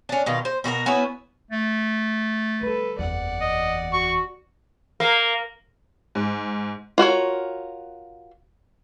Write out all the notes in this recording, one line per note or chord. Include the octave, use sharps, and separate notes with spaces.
C#4 D4
B2 D#3 F4
C5
B2 F#4 G4 A#4
B3 C#4 E4 F#4
A3
D3 G3 A4 B4
F#1 E2 D5 F#5
D#5
F#4 C#6
A#3
G#2
F4 F#4 A#4 C#5